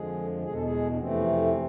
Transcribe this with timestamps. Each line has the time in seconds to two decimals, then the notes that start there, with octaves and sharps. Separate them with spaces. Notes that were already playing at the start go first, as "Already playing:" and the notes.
Already playing: F2 D3 F3 G#3 G#4
0.43 E2 B2 G#3 G#4
0.53 A4
0.63 G#3 G#4
0.93 D4
0.98 F2 C3 E3 A3 C4